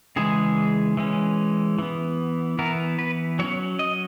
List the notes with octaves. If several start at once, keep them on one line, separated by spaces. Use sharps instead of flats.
C#3 E3 G#3 G#4
E3 G#3 C#4
E3 B3
E3 B3 A#4
B4
F#3 C#4 C#5
D#5